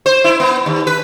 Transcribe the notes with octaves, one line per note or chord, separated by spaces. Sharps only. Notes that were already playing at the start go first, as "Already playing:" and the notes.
C5
E4
B3
D#2
B4